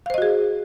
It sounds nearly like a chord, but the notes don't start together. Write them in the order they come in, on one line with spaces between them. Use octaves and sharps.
F5 C5 D#5 F#4 G#4